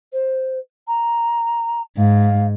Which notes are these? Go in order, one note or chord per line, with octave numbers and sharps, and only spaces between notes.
C5
A#5
G#2 F5